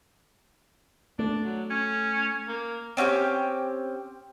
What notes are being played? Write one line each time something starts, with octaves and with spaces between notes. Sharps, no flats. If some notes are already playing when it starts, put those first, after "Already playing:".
A3 D4
F#3
C#4
A#3
C4 C#4 E4 G4